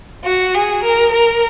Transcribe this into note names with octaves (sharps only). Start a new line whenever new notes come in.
F#4
G#4
A#4
A#4